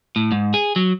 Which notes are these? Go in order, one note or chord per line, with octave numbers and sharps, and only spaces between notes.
A2
G#2
G#4
F#3